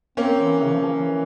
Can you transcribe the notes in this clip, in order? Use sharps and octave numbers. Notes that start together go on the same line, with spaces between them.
A#3 C4 C#4
E3
C#3
F3
E3